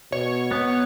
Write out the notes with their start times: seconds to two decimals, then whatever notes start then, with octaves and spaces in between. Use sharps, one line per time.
0.12 B2 C#5
0.51 B3